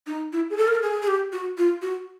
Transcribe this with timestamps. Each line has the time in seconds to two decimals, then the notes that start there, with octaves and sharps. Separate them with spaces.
0.07 D#4
0.33 E4
0.50 G#4
0.57 A4
0.68 A#4
0.75 A4
0.82 G#4
1.02 G#4
1.08 G4
1.33 F#4
1.58 F4
1.82 F#4